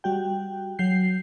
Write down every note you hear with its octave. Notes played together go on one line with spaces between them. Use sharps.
G3 F#4 G5
F#3 G6 C7